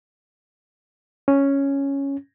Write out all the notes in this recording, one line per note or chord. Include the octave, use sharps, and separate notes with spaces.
C#4